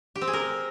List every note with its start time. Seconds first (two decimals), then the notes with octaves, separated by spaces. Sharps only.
0.15 G4
0.21 C4
0.27 G#4
0.33 A#4